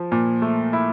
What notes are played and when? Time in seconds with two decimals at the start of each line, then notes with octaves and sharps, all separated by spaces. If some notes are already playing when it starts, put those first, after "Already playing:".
Already playing: F3
0.12 A#2
0.42 A3
0.73 E4